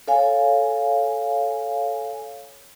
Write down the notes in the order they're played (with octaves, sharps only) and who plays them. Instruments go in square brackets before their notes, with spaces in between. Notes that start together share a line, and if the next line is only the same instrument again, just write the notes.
[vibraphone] A4 C#5 F5 G#5